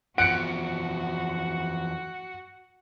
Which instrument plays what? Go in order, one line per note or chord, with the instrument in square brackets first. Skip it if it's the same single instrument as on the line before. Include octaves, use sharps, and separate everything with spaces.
[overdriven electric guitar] E2 F3 [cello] F#4 [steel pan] F#5 [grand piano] C#7 D7